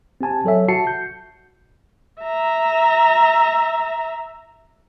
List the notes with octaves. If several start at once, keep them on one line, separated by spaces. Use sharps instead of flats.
C4 G4 G#5 A5
F#3 A4 C#5 E5
F#4 A5 C7 C#7
G6
E5 A#5